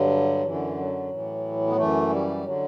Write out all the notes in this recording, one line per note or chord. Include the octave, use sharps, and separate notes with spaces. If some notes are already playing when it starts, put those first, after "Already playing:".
Already playing: G2 D3 F#3
F#2 D3 E3
F#3
A2 E3
B3
F#2 E3 A3
G3
D3 F#3